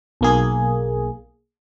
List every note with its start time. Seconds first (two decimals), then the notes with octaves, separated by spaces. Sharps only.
0.21 B1 A#3 G#4